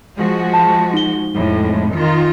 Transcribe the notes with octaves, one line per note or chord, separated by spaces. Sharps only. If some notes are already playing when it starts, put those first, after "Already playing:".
F3 G#3 F#4
A5
D#4 G7
F2 A2 G#3
D#3 F4